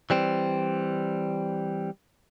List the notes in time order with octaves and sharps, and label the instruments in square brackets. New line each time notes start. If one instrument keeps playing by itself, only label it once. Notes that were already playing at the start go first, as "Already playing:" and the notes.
[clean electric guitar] E3 G3 C4